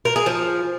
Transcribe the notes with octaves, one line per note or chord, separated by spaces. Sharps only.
A#4
G#4
F3